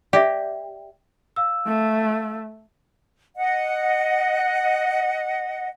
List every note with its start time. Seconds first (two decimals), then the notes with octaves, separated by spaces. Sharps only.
0.13 G4 D5 E5
1.36 F5 E6
1.67 A3
3.36 D#5 F#5